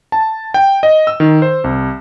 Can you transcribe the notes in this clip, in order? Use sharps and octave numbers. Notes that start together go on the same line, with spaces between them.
A5
G5
D#5
E6
D#3
C5
C2